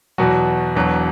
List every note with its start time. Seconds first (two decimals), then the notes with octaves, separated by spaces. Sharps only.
0.18 E2 B2 F#3 F#4
0.75 E1 E2 B2 F#3